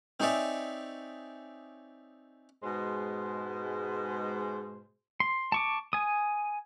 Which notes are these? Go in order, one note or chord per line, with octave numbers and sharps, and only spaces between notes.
C4 D#4 G#4 C#5 D5 E5
G#2 B2 G#3 C5
C6
A5 C#6 D6
G#5 D#6